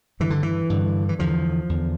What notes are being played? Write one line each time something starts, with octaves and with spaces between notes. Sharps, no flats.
G2 D3 E3
D3
E3
G2 D3
E3
E2 D3 F3
E2 D3